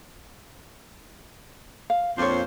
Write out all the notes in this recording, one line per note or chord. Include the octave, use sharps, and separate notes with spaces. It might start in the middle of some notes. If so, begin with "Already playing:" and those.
F5
F2 A#2 D4 F4 C5 C#5